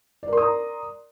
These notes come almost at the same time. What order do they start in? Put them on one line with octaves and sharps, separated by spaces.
D5 A#4 C6 D#6 A#5